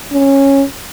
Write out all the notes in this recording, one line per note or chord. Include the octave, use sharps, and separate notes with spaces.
C#4